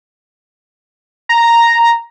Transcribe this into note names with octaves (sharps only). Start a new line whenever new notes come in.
A#5